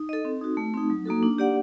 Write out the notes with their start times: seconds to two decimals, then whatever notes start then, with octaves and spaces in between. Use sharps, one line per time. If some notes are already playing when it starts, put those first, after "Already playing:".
Already playing: D#4
0.09 A4 D#5
0.25 C4
0.41 D#4 F#4
0.57 A3
0.74 C4 D#4
0.90 F#3
1.05 A#3 D#4 F#4 A4
1.23 D4
1.38 G4 D5 F#5